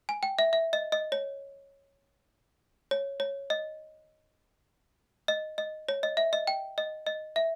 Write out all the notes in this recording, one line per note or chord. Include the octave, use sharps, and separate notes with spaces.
G#5
G5
E5
E5
D#5
D#5
C#5
C#5
C#5
D#5
D#5
D#5
C#5
D#5
E5
D#5
G5
D#5
D#5
E5